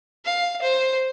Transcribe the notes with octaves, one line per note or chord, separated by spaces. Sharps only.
F5
C5